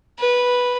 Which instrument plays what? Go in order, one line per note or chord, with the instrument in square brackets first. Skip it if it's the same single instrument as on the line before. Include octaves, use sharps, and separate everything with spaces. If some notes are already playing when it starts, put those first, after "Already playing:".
[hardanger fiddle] B4